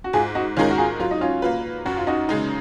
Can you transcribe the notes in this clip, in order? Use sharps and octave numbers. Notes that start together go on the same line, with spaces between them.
F#4
G#2 F4 G#4
D#4 F#4
D#3 G#3 C#4 D#4 F4 A#4
F#4
F4 G#4
F#3 F4
D#4
C#4 F4
A#3 F4 B4
F#2 F#4
F4
D#4 F#4
C#3 G#3 D#4